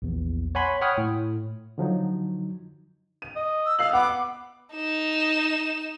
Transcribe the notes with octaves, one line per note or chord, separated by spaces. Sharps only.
A#1 E2
C#5 F#5 G#5 B5 C6
C#5 F#5 G5 B5 D#6 F6
A2
D3 F3 F#3 D#4
D#7
D#5
E6
D#5 F5 E6 C7 F#7
B3 F#5 D6
D#4 E7